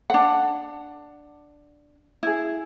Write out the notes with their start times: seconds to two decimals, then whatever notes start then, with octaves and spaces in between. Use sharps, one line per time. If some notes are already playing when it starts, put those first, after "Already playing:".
0.10 D4 F#5
2.23 E4 G#4